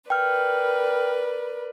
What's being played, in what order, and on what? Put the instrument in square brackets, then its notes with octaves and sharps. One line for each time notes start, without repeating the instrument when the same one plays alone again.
[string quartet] A#4 B4 D5 [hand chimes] G5 F6